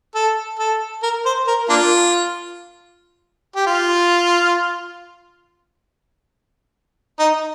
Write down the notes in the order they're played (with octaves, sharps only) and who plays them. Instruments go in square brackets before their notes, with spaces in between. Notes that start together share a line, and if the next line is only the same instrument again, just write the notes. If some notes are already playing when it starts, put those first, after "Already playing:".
[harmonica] A4
A4
A#4
C5
A#4
A#3 D4 F4
G4
F4
D#4